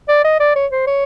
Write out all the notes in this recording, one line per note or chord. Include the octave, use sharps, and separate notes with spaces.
D5
D#5
D5
C#5
C5
C#5